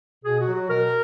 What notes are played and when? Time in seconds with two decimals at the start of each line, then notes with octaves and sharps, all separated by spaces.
0.24 B2 G#4
0.40 F#4
0.47 F#3
0.54 F#4
0.70 B2 A#4